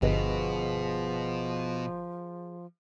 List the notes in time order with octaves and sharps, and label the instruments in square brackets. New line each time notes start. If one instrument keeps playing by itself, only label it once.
[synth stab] G1 [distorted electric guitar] B2 [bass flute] F3 [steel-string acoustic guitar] G#4 B4 D#5